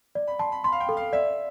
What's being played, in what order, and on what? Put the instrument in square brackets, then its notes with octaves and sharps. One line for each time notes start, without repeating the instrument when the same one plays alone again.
[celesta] D5
[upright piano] B5
[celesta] A5 [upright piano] C6
[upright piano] B5
[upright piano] B5 [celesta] C6
[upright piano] F5
G5
[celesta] A4
[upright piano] F5
[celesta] D5 [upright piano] E5